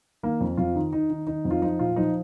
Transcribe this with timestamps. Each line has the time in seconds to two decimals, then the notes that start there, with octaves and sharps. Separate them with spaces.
0.23 D#3 A#3
0.41 F2
0.57 F2 F4
0.75 D#3
0.93 D#3 D#4
1.10 D#3
1.27 D#3 D#4
1.45 F2
1.51 F4
1.62 F3 D#4
1.79 A#2 F4
1.96 F3 D#4